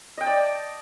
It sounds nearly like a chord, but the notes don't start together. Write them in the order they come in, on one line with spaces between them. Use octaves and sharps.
D#5 G5 A5 D5